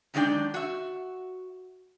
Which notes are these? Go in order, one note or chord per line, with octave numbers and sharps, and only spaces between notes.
F#2 D#3 G#3 D4 D5 G5
F#4 E5